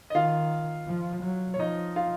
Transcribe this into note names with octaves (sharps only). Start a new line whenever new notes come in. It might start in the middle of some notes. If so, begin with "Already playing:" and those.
D#5
D#3 F4 F5
F3
F#3
C#5
F3 D#4 D#5
F4 F5